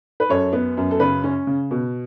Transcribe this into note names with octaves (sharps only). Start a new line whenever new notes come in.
B4
F#2 A4 C#5
B3
F#2
A4
C#3 B4
C#4
C#3
B2